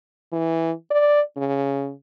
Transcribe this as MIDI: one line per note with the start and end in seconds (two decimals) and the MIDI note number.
0.33 0.72 52
0.91 1.21 74
1.37 1.91 49